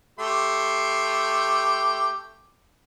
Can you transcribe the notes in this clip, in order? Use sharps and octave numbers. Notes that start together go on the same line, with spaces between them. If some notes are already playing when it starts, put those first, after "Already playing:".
A3 G4 C6